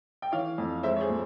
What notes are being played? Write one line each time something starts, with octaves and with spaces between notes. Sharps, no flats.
G5
E3 C#5 F5
F2
G#3 C5 E5
C#5
G#4 C5
A#2